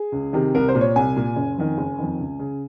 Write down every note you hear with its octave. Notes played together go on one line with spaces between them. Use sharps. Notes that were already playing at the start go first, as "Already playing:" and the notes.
Already playing: G#4
C#2
C3 D#3
C2 A#4
C5
A#2
C#5
C2 G#5
A#2
F#1
F2 D#3
F#1
F2 D#3
C#2
C#3